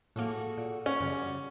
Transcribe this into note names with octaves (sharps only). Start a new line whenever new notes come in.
A2 A#3 F#4 G#4 A4
A#2
C#4
F#2 C#3 G3 F#4 D5